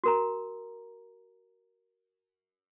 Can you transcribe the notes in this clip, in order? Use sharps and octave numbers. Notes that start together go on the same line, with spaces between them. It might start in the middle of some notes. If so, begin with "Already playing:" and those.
F#4 A#4 A#5